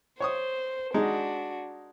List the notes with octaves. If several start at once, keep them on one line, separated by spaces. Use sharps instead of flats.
C5 C#5 C#6 D#6
G#3 D4 D#4 F#4